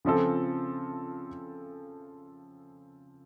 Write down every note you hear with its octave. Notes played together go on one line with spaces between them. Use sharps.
C#3 F3 C4 F4 A4